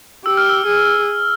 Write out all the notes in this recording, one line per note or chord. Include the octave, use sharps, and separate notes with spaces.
G4 E6
F6
E6
G#4